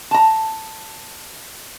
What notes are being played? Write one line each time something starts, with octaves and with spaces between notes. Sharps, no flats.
A5 A#5